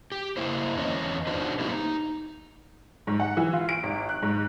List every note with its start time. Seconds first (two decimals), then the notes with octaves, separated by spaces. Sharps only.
0.12 G4
0.37 A#3 E4 C5
0.76 E2 C#4 D#5
1.27 D4 D#4 F#4 B4 C5
1.60 A3 A#3 C4 E4 G4
1.72 D#4
3.07 G#2
3.20 F#5
3.37 E3
3.53 F4
3.69 D7
3.83 G#1
4.09 F#6
4.22 G#2